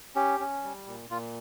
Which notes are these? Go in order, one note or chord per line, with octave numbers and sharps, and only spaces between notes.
C#4 G4
C#4
G3
A#2
A#2 F4